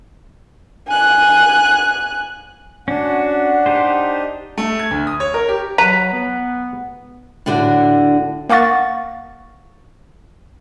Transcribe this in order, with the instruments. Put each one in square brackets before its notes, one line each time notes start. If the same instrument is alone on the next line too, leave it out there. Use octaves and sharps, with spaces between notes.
[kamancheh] G#5 F#6
[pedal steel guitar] C#4 F#4 [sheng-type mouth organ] D4 [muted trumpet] F#5
[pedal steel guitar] D#4 G4 C5
[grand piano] A3
G#6
D2
D#6
C#5
A#4
G4
[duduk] F#3 [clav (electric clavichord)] B4 [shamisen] A#5
[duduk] B3
[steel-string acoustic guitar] A2 D3 D4 F#4
[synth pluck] A#3 F5 F#5 C#6 A6